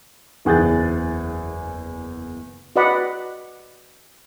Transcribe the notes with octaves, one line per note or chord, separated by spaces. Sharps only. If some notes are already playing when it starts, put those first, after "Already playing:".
F#1 E2 G#4 F#6 G6 A6
F#4 B4 D5 D#5 F#5 B5